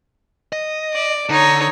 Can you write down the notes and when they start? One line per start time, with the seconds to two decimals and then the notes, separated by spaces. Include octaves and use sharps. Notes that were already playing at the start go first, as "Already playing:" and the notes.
0.53 D#5
0.93 D5
1.29 D3 D#4 C#5